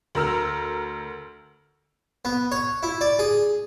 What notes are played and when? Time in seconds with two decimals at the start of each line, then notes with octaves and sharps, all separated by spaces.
0.15 D2 A#4 E6 F6
2.25 B3
2.52 C#5
2.83 E4
3.01 D5
3.19 G#4